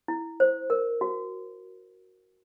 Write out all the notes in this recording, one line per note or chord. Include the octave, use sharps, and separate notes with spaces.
E4
C5
A#4
F#4